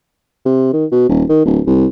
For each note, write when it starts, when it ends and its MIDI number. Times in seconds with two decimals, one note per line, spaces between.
0.45 0.69 48
0.73 0.85 51
0.92 1.06 47
1.09 1.23 27
1.29 1.42 51
1.45 1.60 26
1.66 1.86 36